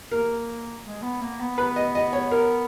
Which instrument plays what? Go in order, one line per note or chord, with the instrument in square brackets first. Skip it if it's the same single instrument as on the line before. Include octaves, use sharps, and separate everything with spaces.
[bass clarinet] A#3 [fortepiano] A#4
[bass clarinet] G#3
B3
A#3
B3
[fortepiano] B4
D#5
D#5
C#5
A#4